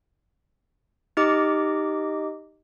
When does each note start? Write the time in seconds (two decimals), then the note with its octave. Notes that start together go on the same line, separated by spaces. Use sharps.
1.17 D#4 G4 D#5 D6